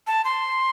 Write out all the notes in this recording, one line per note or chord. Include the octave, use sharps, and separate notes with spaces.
A5
C6